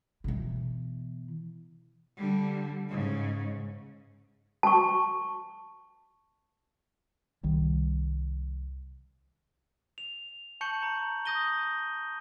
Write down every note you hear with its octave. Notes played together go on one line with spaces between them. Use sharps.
B2 E3
D3 G3
G#2 C#3
A5 C#6
C2 D#3 G3
F7
A5 C#6 G6 C#7 F#7
A#5 C#7
D#6 G6 A#6 D#7 G7